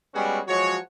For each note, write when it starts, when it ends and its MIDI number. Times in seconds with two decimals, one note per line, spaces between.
0.14 0.39 55
0.14 0.39 56
0.14 0.39 59
0.14 0.39 61
0.14 0.39 66
0.14 0.39 68
0.48 0.77 53
0.48 0.77 54
0.48 0.77 56
0.48 0.77 66
0.48 0.77 73